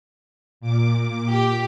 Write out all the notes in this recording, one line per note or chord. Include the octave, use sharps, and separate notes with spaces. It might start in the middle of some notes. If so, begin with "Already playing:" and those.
A#2 D6
G4